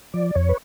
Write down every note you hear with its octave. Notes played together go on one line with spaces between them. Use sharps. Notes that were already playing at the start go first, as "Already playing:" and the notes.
F3 D5
F2 C#5
B4